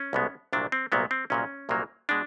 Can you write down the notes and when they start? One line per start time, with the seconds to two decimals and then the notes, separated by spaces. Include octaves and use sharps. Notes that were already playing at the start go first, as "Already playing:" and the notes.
Already playing: C#4
0.13 C2 B2 G#3 B3
0.53 C2 A#2 F#3 A#3 D4
0.72 C4
0.92 C2 A#2 F#3 A#3 B3
1.11 C4
1.30 C2 A#2 F#3 A#3 C#4
1.69 C2 A#2 F#3 A#3
2.09 B2 G#3 D4